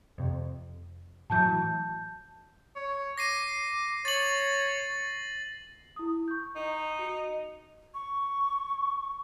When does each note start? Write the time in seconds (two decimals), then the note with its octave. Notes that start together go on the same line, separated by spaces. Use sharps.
0.18 F2 C3
1.30 A2 E3 F#3 A5 G6
2.75 C#5
3.18 D6 A#6 C7 D#7
4.05 C#5 A6 F#7
5.96 E4 D#6
6.28 C#6 G6
6.56 D#4
6.99 F#4 C#7
7.94 C#6